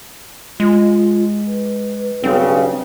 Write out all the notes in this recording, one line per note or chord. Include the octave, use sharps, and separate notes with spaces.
G#3 F4
B4
B1 G2 C#3 C4